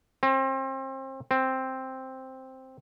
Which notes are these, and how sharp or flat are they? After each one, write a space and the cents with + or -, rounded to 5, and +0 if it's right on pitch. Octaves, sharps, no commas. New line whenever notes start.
C4 +35
C4 +5